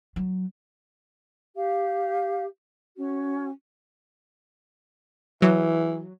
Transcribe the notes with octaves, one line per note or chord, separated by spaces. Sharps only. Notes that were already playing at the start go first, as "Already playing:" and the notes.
F#3
G4 F5
C#4 F#4
E3 F#3